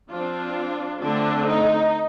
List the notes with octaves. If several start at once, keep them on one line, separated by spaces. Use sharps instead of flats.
F3 C4 D4 F4
D3 A3 C4 D4
D#4